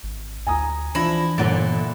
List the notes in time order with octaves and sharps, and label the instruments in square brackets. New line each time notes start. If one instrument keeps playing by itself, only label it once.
[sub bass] G#1
[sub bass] D2 [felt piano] G#5 A#5 D#6
[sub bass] E3 [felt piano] F3 D4 A#6 [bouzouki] E4
[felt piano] G1 F#5 A6 [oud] A#2 D3 A#3